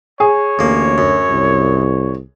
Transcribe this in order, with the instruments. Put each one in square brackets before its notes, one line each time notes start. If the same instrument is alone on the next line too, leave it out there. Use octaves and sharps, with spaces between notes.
[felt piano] G#4 [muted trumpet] C#5
[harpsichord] A1 A#3 [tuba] D2
[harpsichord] F#2
[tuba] C2